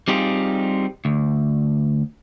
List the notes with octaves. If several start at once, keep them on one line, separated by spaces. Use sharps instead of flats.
G3 C4 D#4 F4 G4 G#4
D2